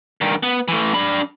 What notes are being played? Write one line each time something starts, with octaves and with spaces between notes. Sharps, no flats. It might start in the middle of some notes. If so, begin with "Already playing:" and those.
G2 D#3
B3
E3 A3
D4 B5